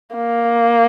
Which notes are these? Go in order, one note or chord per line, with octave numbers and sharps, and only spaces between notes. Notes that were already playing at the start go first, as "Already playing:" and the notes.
A#3